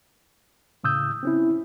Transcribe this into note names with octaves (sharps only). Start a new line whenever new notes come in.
A2 C#3 D#6 E6 G6
C4 C#4 E4